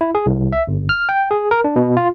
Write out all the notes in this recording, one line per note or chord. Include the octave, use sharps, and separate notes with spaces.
E4
G#4
C2
E5
G1
F6
G5
G#4
A#4
D4
B2
F4